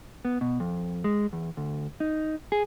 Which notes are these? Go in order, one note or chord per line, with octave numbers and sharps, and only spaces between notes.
B3
B2
F2
G#3
E2
D2
D#4
G#4